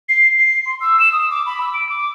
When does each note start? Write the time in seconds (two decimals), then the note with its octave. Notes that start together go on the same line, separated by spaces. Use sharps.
0.09 C7
0.38 C7
0.66 C6
0.81 E6
1.00 E7
1.12 D#6
1.31 D6
1.46 B5
1.61 E6
1.74 D7
1.89 D6